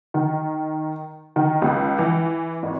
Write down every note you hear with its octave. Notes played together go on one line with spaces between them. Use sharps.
D#3
D#3
C#2
E3
G#1